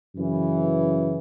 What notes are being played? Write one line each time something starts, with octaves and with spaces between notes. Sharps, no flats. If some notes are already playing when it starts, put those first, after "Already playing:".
F#2 C#3 E3